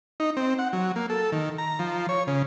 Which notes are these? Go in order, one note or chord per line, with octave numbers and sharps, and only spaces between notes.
D#4
C4
F#5
F#3
A#3
A4
D#3
A#5
F3
C#5
C#3